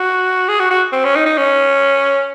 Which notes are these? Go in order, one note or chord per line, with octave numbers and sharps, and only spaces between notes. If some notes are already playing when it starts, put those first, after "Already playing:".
Already playing: F#4
G#4
F#4
F#4
C4
C#4
D#4
D#4
C#4